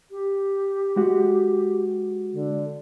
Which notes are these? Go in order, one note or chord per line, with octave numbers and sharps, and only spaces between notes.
G4
G#3 F#4
D3